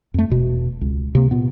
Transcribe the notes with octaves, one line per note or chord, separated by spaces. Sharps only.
F2 A3
E1 B2
C#2
C3 A#3
A#2 B3